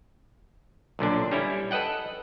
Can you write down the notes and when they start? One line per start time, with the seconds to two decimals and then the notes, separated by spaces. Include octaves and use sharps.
0.99 B1 A#2 D3 D4
1.31 G3 C#4 E4
1.71 A4 B4 D#5 F#5 G5